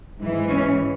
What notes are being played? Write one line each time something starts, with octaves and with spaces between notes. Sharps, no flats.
G#2 E3
C#4